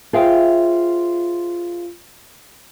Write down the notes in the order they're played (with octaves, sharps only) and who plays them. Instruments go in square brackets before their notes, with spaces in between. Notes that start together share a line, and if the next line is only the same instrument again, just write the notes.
[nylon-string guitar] F4 G#4 C5 E5 F5 G5